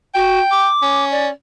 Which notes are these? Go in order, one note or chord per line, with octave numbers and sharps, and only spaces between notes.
F#4 G5
D6
C#4
D5